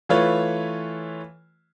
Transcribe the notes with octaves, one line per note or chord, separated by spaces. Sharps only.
E3 A3 F4 B4 C#5